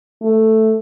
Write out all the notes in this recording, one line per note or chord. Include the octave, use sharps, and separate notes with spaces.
A3